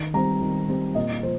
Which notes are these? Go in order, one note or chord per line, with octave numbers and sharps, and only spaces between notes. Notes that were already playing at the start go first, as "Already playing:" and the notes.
Already playing: D#3
G3 C4 A#5
D#3
G3 C4
A#2 D#5
F3 C5